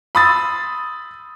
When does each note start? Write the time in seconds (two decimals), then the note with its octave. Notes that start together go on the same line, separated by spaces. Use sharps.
0.15 B5 C6 D#6 E6 A6